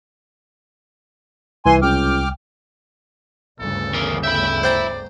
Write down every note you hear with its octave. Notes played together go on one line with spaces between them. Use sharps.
C2 E3 G#5 C6
C#2 G5 D6 F6
G1 D2 C#3 A4
E2 A#4
E5 G5 B5
C5 D5 G5 A#5